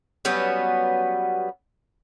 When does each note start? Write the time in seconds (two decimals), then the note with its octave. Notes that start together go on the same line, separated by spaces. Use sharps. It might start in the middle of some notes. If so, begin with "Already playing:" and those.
0.25 F#3 G3 B3 C#4